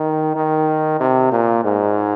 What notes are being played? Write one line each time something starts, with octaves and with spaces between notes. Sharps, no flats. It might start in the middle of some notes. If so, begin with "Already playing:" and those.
Already playing: D#3
D#3
C3
A#2
G#2